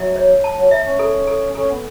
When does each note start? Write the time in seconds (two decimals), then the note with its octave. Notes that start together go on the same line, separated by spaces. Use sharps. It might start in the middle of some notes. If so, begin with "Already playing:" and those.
Already playing: F#3 E5
0.16 C#5
0.44 A5
0.57 F#3
0.71 E5
0.86 C#4
0.99 A4
1.27 A4
1.55 C#4 A4
1.69 B3